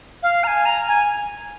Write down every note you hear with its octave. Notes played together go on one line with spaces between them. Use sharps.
F5
A#5
G#5
A#5
G#5